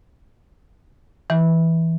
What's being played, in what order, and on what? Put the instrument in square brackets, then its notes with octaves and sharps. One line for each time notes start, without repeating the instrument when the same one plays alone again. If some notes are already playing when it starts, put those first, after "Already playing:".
[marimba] E3